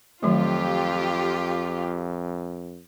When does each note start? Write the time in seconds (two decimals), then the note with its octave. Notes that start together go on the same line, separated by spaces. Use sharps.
0.23 F2 D#3 F#3 A3 F4 G4